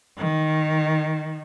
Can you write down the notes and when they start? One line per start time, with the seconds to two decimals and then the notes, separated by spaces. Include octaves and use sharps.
0.18 D#3